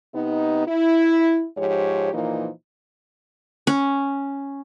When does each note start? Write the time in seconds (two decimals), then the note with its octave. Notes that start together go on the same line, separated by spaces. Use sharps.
0.15 C3 B3 D#4
0.67 E4
1.57 G#2 F3 G4 C#5
2.13 A#2 E3 F3 A#3 D#4
3.67 C#4